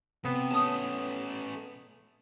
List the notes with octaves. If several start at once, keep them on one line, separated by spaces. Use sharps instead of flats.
C3 B3
A3 C#4 A5 D#6